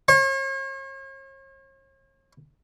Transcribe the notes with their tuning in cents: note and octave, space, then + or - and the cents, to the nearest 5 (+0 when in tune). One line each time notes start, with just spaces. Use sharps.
C#5 -45